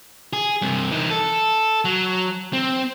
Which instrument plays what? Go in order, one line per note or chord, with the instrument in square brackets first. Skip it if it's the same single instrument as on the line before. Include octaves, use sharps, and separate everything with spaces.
[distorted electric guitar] G#4
G2 C3
E3 D#4
A4
F#3
C4